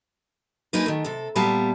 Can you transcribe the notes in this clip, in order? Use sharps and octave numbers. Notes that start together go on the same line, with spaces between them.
G#3 A#3 D4 D#4 B4
D#3 A3
C3 A4
A#2 G3 B3 E5 F5 A5